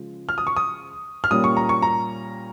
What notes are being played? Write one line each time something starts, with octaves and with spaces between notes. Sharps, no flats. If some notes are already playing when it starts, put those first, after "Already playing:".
Already playing: C#3 F3 G#3
F6
D#6
C#6
D#6
F6
A#2 G3 A#3 C#4 D#6
C#6
A#5
C#6
A#5